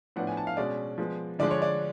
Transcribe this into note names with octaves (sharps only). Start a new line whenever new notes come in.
A2 F3 B3 D4 F#5
G#5
A5
F5
B2 G#3 C#4 D5
F3 G#3 B3
D3 F3 G#3 D4 D5
C#5
D5